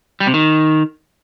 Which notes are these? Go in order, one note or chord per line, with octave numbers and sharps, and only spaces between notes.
G3
C3
D#3